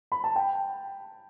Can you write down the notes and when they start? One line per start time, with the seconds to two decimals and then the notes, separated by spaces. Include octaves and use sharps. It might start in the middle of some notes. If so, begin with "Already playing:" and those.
0.12 B5
0.24 A5
0.36 G5